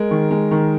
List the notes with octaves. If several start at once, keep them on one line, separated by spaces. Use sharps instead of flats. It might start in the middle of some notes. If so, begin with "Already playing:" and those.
Already playing: G#3 A#4
D#3
G#3
D#3